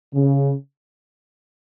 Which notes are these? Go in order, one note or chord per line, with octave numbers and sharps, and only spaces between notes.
C#3